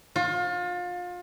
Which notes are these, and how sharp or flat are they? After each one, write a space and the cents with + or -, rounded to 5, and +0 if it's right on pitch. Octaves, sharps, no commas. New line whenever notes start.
F4 +30